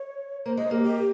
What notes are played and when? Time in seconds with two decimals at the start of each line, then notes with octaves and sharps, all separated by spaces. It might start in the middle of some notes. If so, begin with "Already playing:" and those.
Already playing: C#5
0.46 A#3 C5
0.57 G#3 D#5
0.71 A#3 G4
0.83 G4